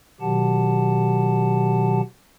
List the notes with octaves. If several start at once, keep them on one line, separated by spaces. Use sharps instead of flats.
B2 D#3 F#3 G4 F#5 A5